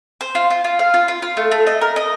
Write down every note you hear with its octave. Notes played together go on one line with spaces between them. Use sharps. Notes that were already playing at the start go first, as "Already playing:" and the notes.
C5
F4
F4
F4
F5
F4
F4
F4
A3
A3
D#5
A#4
D#5